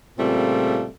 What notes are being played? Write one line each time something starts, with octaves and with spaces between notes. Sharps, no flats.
A#2 C#3 G3 A3 C4 F4